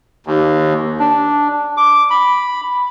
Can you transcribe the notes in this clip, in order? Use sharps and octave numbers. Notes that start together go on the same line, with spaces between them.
D#2
D4
D6
B5